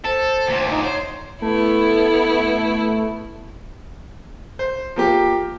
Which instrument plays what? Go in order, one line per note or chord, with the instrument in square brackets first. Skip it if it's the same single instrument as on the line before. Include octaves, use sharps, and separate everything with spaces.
[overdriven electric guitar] A4 [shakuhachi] C5
[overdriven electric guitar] D2 A#2
[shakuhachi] D#4
[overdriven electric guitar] C5 [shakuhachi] C#5
[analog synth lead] A3 [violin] B3 E4
[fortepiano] C5
F3 A#3 G4